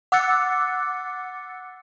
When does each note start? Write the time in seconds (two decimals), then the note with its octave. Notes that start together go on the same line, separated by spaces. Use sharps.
0.12 F#5 D6 E6 F#6 A6 C#7